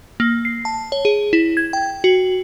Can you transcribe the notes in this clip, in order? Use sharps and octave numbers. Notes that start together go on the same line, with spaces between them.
A#3
C7
A5
C#5
G#4
E4
G#6
G5
F#4